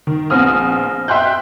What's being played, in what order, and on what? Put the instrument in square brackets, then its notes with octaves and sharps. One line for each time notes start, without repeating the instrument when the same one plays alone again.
[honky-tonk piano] D#3
A#1 B3 C4 D#6 F6
E5 G5 C6 F#6 G6